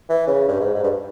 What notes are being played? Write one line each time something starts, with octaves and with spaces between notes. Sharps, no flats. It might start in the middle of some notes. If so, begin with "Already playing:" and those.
E3
C#3
G2
G#2
G#2
G2